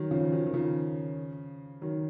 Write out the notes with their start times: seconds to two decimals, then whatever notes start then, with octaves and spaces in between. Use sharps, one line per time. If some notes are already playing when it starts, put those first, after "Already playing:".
Already playing: D#3 F#3
0.11 C#3 F3
0.25 F3
0.32 D#3 F#3
0.47 D#3
0.54 C#3 F3
1.81 D#3 F#3